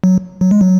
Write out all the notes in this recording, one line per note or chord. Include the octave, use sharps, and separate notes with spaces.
F#3
F#3
G#3
F#3